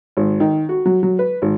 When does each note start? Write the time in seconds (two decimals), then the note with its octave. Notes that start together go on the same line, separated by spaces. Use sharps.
0.17 G#1
0.40 D#3
0.69 F#4
0.86 F#3
1.03 F#3
1.19 B4
1.42 G#1